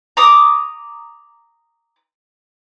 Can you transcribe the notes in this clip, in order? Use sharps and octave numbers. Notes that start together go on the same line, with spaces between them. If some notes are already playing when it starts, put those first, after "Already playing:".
A#5 D6 D#6